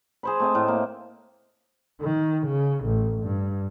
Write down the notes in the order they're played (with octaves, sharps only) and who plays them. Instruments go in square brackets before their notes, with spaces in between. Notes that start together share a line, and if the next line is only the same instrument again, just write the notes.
[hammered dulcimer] G#4 C5 B5
A3 C4 D#5
A2
A#3
[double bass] D#3
C#3
A1
G2